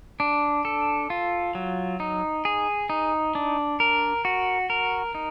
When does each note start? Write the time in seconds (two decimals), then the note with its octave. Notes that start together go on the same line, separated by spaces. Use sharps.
0.20 D4
0.65 A4
1.10 F4
1.55 F#3
2.00 D#4
2.45 G#4
2.90 D#4
3.35 D4
3.80 A#4
4.25 F#4
4.70 A#4
5.15 D#4